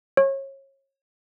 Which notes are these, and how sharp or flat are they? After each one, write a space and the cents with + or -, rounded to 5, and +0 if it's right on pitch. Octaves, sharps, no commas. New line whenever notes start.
C#5 -30